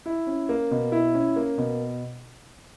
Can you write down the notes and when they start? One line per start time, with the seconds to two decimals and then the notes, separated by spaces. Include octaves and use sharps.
0.06 E4
0.27 C#4
0.49 A#3
0.71 B2
0.92 E4
1.15 C#4
1.36 A#3
1.58 B2